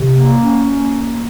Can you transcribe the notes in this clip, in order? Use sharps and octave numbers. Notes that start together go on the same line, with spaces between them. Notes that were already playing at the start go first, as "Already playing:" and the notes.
Already playing: C3
A#3
C#4
A#3